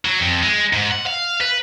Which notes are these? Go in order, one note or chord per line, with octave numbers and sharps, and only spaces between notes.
F#3
F2
G#3
G#2
F#5
F5
B4